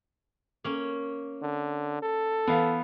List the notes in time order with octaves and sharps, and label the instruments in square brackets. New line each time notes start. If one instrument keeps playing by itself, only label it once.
[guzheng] A#3 C#4
[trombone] D3
A4
[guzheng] E3 [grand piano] B3 F5